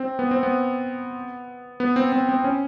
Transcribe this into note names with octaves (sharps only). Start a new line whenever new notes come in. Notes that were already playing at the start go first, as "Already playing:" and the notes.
Already playing: C4
B3
C4
B3
B3
C4
C4
C4
C#4